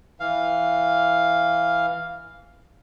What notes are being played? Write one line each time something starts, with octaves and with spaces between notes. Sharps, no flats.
E3 F5